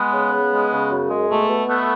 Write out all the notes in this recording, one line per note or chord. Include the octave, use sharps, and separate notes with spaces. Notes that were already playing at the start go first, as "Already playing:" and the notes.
Already playing: G#3 B3
C#3
C#3
G#3
C#3
F#2
G#3
B2 A3
B2
A3 B3